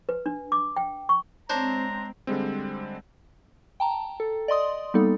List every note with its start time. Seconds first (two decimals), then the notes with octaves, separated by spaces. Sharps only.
0.09 B4
0.26 D4
0.52 D6
0.77 G5
1.09 C#6
1.49 G#3 C4 D4 C5 C#5 A#5
2.27 D3 G3 G#3 C4
3.80 G5 A5 A#5
4.20 A4
4.48 D5 D#5 C6 D#6
4.94 G3 A#3 B3 D#4 A4